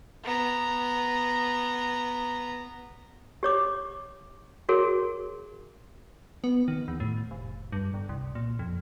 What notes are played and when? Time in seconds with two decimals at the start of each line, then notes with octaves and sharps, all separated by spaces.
0.24 B3 A#5
3.43 G4 C#5 D6
4.69 F#4 G#4 A#4 C#5
6.44 B3
6.68 D#3
6.88 E2
7.00 A2
7.31 F1
7.72 G2
7.94 G1
8.09 C2
8.35 A#2
8.59 F2